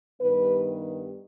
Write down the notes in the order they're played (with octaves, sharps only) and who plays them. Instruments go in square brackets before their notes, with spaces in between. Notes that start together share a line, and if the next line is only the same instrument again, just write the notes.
[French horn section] G2 D#3 G3 B3 B4